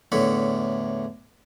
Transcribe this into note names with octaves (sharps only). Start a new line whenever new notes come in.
E2 A2 D3 C#5 B5